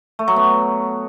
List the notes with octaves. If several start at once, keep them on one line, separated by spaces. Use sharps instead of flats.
A3
F#3
B3